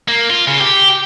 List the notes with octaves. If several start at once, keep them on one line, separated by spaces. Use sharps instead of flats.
A#3
F4
C#3
G4